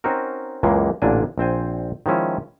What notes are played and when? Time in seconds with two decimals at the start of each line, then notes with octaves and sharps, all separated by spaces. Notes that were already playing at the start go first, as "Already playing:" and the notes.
0.04 C4 C#4 D#4 F#4 A#4
0.63 C#2 F#2 E3 G#3 A#3
1.02 A1 A#2 D3 A#3 D4 G#5
1.38 A#1 C4 C5 G#5
2.06 D#3 F3 G#3 C#4 E4